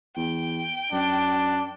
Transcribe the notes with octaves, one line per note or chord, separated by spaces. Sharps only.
E2 G5
F#2 D4